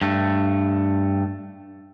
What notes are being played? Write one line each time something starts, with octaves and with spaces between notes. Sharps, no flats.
G2 A3